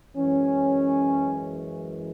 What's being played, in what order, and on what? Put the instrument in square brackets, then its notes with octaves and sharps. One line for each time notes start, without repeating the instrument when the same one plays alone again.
[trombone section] F#2 E3 G#3 C#4